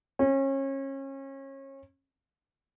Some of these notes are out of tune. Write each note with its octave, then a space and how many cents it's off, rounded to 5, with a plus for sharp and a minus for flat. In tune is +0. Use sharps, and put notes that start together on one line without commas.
C#4 -30